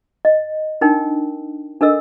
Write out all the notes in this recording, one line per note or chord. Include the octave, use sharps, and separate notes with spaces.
D#5
D4 D#4 A#4 G5
D4 A4 A#4 D#5 E6